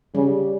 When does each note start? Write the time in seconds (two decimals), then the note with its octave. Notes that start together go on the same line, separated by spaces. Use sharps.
0.15 C#3 G3